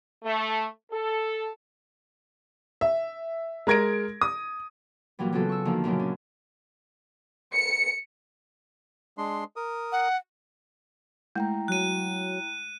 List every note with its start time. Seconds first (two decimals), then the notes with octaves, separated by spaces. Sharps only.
0.24 A3
0.91 A4
2.81 E5
3.67 G#3 A#4 G#6 A#6 D7
4.21 D#6
5.19 A#2 E3 F#3 G3
5.32 C#3 F#3 B3 F4 F#4 A4
5.49 C#6 E6
5.65 D3 D#3 F3 A#3
5.84 F#2 A#2 C#3 F#3
5.99 C#4 D4
7.54 C#7
9.18 G#3 D4 C6
9.56 A#4 D#6
9.92 F#5
11.36 G#3 A3 E4 G5 A#5
11.68 F#3 F#6 D#7